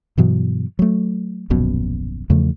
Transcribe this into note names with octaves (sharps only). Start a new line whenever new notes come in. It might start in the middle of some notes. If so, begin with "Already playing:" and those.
G2 B2 E3 F#3
F#3 A3
D#1 A#1 F#2 B2
E2 C#3 F3 A3